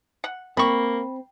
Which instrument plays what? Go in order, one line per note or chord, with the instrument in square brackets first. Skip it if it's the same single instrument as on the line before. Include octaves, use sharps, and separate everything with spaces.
[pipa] F#5
[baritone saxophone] A#3 [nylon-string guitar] C4 [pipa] B5 C#6